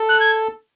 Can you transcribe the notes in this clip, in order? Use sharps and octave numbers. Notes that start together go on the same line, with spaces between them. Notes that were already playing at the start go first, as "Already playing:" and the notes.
Already playing: A4
F#6
G#6